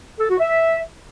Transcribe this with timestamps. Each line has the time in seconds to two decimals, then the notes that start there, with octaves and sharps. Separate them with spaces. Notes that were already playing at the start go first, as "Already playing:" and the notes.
0.19 A4
0.29 F#4
0.40 E5